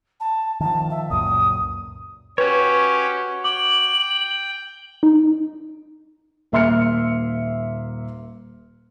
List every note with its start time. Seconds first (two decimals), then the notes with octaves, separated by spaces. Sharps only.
0.20 A5
0.60 D#3 F3 A5
0.90 E5
1.10 C#2 F#2 A#2 D#6
2.38 C#4 F#4 G4 B4 C#5
3.44 G5 D6 F#7
5.03 D#4
6.52 D#1 A#3 E5 C6 F6 C#7